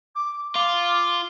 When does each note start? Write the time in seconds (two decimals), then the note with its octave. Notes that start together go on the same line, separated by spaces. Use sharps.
0.15 D6
0.55 F4 D6